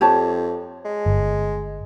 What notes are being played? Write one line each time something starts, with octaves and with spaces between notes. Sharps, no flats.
F2 G4 C#5 A5
G#3
G1